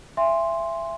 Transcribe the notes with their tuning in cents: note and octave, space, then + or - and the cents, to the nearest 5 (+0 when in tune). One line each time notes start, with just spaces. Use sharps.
E5 +25 G#5 -30 C6 +0